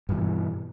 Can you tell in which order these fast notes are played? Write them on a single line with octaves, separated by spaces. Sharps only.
G2 E3 B2